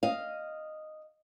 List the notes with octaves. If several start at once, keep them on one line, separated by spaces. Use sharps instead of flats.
D#5 F5